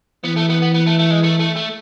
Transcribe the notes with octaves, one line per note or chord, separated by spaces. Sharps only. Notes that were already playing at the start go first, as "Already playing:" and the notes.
E3 B3
A3
B3
B3
B3
A3
A3
G#3
A3
A3
A3